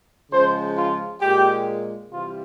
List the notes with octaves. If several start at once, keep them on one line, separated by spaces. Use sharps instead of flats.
C#3 F3 G#3 C5
F4
A#2 G#3 G4
C3 E3 G3 F4